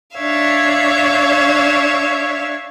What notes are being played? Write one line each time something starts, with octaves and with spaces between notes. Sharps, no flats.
D4 C#5 E5 F5